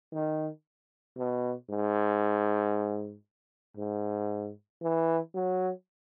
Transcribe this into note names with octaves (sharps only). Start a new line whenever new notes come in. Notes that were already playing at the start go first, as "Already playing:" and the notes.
D#3
B2
G#2
G#2
E3
F#3